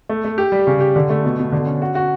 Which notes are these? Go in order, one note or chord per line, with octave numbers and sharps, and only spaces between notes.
A3
A3
G4
G3
C#3
G4
D3
A3
B2
B2
D3
C#4
F#4
F#4